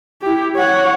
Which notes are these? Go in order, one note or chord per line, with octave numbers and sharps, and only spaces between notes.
E4 G4
C#5 F#5